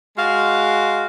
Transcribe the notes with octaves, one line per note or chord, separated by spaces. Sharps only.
G#3 F#4 F5